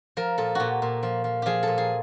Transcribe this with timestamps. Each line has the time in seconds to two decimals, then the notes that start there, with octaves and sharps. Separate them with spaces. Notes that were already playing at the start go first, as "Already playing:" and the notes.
0.17 F3 A#4
0.38 A#2 A4
0.55 A#2 F#4 G4
0.82 A#2
1.03 F3
1.24 F3
1.42 F3 G4 G#4
1.63 A#2 A4
1.78 G#4